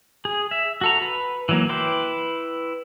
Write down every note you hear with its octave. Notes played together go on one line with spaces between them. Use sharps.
G#4
E5
F#4 A4 A#5
B4
E3 F#3 A#3
E4 B4 G5 C6 D6